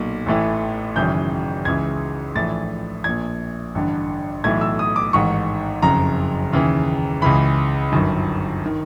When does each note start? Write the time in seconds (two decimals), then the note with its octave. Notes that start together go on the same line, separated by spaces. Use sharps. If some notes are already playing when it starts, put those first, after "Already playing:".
Already playing: B1 A#2
0.26 A1 A2 E3
0.96 G#1 F#2 C#3 E3 G6
1.65 C#2 C#3 E3 G#6
2.35 A#1 A2 E3 A6
3.04 A#1 A#2 G#6
3.75 A1 G2 D3
4.44 B1 A2 E3 G#6
4.61 E6
4.79 D#6
4.96 D6
5.13 A1 G#2 D#3 C#6
5.82 F#1 F2 C#3 A#5
6.52 D#2 C#3 E3
7.22 C#2 C#3 E3 B5
7.92 G1 F#2 D#3
8.66 D#3